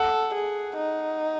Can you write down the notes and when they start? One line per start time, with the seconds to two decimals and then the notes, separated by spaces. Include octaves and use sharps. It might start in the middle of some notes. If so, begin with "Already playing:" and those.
Already playing: A4 F#5
0.34 G#4
0.77 D#4